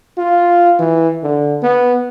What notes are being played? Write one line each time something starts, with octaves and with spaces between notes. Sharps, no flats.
F4
E3
D3
B3